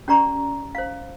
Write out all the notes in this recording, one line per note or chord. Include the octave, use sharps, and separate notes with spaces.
C#4 G4 D5 A#5 C#6
C5 F5